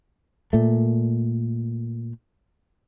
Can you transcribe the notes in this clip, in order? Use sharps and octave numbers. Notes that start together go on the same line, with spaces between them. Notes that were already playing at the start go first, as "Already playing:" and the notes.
A#2 A3